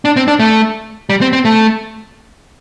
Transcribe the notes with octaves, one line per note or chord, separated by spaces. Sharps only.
D4
C4
D4
A3
G3
C4
C4
A3